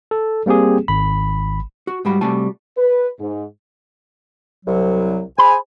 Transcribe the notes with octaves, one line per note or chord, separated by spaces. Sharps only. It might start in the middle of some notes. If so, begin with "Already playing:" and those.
A4
G3 A#3 C4 G4 G#4
G#1 B5
F#4
G#2 F3 G3 F#4 B5
C3 G3 A3 F#4 G#5 A5
B4
G#2
C2 F#3
G#4 C5 G#5 B5